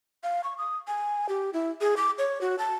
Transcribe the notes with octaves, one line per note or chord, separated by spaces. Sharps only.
F5
C#6
D#6
G#5
G4
E4
G#4
D6
C#5
F#4
A5